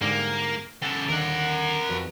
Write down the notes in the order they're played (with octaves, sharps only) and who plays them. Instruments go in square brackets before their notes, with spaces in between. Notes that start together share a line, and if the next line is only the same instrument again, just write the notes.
[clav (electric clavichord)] G#2 D3 G3 [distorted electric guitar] A#3
[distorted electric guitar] C#3 A4 [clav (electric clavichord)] F#5
[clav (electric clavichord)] D#2 D3 [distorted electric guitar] A#4 F#5
[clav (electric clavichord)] F2 F#4 B4